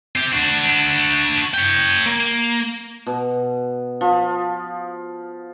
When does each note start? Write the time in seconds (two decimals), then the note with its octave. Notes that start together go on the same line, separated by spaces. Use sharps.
0.16 C4 G4
0.33 D4 F#4
1.54 C#5 G5
2.06 A#3
3.06 B2
4.01 F3